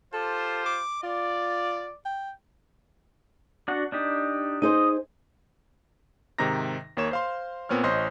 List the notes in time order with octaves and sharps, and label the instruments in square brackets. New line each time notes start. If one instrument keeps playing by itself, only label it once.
[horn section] F4 G4 C5 [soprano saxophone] A4
[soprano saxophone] D6
[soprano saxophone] F4 [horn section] D5
[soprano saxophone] G5
[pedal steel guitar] D4 F#4 F#5
D4 D#4 G4
[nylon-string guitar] D#4 G#4 C5 [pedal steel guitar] D#5
[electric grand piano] G#2 C3 D#3 D#4 A#5 A#6
D#2 A#3 C#5 E7
C5 F5 C6
A#2 B3 C4 C#5 F6
A1 C5 C#5 D#5 C6 G6